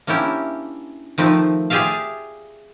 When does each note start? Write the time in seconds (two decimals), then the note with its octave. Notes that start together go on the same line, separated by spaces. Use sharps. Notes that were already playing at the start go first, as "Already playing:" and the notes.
0.07 A#3 C#4 D4 E4 G4
1.18 D#3 F3 A3 C4
1.70 F4 G4 G#4 D5 E5 F5